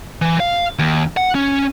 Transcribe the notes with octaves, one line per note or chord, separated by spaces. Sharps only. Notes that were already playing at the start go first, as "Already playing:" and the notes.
E3
F5
D#2
F#5
C#4